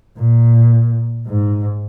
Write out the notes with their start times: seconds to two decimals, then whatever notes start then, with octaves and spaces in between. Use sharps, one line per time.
0.18 A#2
1.27 G#2